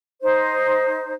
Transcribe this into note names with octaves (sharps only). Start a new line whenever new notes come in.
D#4 C5